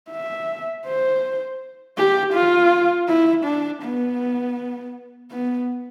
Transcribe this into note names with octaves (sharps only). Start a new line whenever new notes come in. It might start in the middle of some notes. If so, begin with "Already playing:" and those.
E5
C5
G4
F4
E4
D4
B3
B3